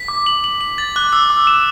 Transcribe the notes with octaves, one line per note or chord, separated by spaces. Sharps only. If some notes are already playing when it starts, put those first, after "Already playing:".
Already playing: B6
D6
F#7
F#7
F#7
A6 F#7
D6 F#6
D6 E6
D6
E7